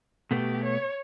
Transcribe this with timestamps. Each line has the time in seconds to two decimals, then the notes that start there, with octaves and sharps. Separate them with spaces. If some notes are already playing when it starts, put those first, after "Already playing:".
0.31 B2 A3 B3 G4
0.64 C#5